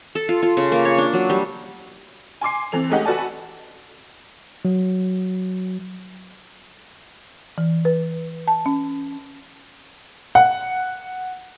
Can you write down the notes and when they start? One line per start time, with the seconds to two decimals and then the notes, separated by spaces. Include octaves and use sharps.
0.15 A4
0.29 F4
0.43 F4
0.57 C#3
0.72 A#3
0.85 C#5
0.98 D4
1.13 F#3
1.30 G3
2.41 G#5 C6 D6 C7
2.72 E3 C4 A4 F7
2.90 G#3 A3 C#4 D#4 G4 F#5
3.05 F#4 A4 B4 D5 G#5 A5
4.65 F#3
7.58 E3
7.85 B4
8.48 A5
8.66 C#4
10.35 F#5